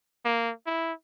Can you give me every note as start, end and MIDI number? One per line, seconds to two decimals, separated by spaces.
0.25 0.51 58
0.66 0.93 64